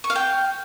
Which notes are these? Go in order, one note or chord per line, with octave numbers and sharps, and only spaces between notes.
C#6
F5
G5